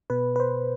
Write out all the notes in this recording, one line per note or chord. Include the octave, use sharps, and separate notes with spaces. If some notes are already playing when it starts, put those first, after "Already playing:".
B2 B4
B4
C5